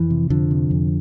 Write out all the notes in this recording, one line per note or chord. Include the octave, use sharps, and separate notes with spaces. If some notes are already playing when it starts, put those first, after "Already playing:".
Already playing: F2 E3
C3
F2 D3 F3
C3
F2